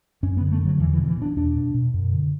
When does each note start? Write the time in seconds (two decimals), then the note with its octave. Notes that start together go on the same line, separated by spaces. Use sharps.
0.23 F#2 C#4
0.37 B3
0.41 D3
0.51 A3
0.61 D3 F#3
0.80 E2 E3
0.93 E3
0.98 B2
1.08 E3
1.17 B2 D4
1.36 E2 D4
1.56 B2
1.74 B2
1.94 F#2
2.12 D3